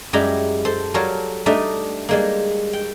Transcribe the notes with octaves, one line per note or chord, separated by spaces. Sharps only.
F#2 G3 G#3 E4 G4 A#5
A4 C5
F#3 G3 A4 A#4 C#5 F5
G3 A3 D4 D#4 D#5 E5
G3 G#3 A#3
G5